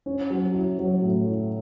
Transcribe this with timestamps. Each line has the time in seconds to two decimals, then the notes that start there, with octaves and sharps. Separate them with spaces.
0.06 C#4
0.30 F#3
0.54 E4
0.79 F#3
1.02 A2
1.26 E4